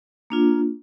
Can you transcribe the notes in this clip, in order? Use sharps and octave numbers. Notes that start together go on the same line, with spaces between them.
A#3 D4 F4